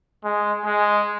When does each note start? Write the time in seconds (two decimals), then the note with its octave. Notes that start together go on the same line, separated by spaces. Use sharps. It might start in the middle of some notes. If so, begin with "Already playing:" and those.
0.25 G#3
0.65 G#3